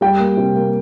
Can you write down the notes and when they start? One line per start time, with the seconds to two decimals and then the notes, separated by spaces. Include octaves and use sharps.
0.01 G3 G5
0.19 A#3
0.37 C3
0.55 A#3